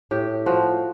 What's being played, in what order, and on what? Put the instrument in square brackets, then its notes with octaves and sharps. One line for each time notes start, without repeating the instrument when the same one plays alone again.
[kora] A2 G4
F3 F#4